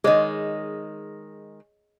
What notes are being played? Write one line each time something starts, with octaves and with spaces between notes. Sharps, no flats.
D#3 G#3 G#4 C#5 D#5